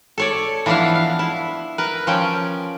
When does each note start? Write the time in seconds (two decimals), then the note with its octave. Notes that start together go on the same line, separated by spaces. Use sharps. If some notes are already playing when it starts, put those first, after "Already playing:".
0.18 A4 C#5 D5
0.66 E3 F3 B3 D4 E4 F5
0.96 F5
1.19 E4
1.78 A#4 B4
2.07 F3 C#4 G5